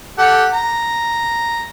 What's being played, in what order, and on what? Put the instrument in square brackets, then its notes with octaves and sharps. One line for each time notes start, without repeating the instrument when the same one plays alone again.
[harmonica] G4 A4 F#5
A#5